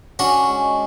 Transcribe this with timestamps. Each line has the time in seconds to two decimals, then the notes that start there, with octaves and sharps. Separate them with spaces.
0.19 C#4 D4 F#4
0.48 G#3